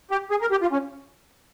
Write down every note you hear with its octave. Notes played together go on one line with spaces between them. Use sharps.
G4
G#4
A#4
G4
F4
C#4